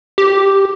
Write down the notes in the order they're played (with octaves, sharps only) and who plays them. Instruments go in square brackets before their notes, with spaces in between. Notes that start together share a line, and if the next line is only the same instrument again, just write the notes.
[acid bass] G4